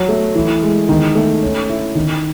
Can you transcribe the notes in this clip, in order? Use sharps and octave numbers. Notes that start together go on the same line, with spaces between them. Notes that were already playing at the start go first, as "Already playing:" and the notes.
Already playing: F#3
A3
E3
G#3
D#3
A3
C#4
E4
D#3